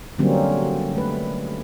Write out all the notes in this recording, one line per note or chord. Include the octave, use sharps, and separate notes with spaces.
D3 F#3 G3 A#3 C4 C#4
A3 B4